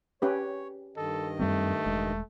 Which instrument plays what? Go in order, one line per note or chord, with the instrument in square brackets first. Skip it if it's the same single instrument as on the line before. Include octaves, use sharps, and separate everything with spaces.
[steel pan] C#4 G4 B4 [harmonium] C#5
[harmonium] G2 D#3 D#5 [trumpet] A4
[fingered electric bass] F#2 G3 C4 [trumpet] A3
[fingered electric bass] E1 G#3